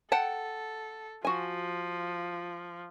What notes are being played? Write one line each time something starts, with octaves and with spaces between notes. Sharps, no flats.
A4 F#5 G5 A5
F3 F#4 G#5